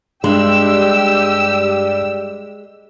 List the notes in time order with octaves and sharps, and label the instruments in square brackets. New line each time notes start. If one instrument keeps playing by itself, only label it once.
[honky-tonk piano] G2 [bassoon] G3 [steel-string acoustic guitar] G#3 [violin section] G4 E6